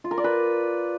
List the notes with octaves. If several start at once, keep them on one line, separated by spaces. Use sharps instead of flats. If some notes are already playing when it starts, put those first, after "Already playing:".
F4
A#4
D5
B4